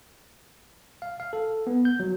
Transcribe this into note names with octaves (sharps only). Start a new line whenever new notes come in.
F5
F5
A4
B3
G6
F#3